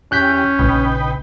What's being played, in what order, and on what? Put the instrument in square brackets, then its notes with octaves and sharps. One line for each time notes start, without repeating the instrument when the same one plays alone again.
[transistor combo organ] E2 G4 [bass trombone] C#4 [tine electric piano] F#6 G6 B6
[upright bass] A#1 C#3 [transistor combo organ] D#4 B4 G5